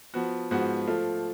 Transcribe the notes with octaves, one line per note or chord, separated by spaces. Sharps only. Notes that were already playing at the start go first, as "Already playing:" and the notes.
F3 B3 F#4
G#2 F3 B3 F#4
F3 A3 F4